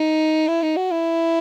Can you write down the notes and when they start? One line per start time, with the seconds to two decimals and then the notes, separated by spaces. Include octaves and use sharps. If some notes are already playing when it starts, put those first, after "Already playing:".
Already playing: D#4
0.48 E4
0.62 D#4
0.77 F#4
0.91 E4